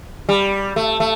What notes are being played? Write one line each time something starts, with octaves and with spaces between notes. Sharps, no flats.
G3
A3
A3